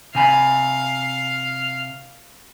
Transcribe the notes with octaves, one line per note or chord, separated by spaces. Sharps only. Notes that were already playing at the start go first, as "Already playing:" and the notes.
C3 F5 G#5 B5